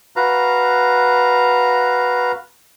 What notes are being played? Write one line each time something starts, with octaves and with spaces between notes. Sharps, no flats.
F#4 B4 F5 A#5